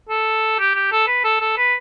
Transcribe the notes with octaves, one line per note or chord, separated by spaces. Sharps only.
A4
G4
G4
A4
B4
A4
A4
B4